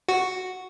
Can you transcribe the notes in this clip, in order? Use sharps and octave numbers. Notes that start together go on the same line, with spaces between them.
F#4